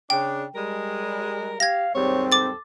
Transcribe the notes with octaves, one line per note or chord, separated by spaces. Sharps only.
C#3 D4 G5
G3 G#3 A#4
G4 F5 G#6 A#6
D#2 G#2 G3 C4 C#5
A4 D6 A6